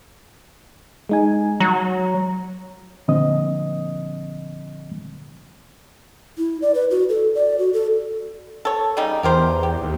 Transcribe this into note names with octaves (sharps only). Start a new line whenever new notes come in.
G#3 D#4 G#5
F#3 A#5
A#2 D3 F3 C4 D#5 D#6
E4
D5
B4
F#4
A4
D5
F#4
A4
A4 C#5
C#3 G3 D#4
E2 G4 A#4 C5
G4
D#2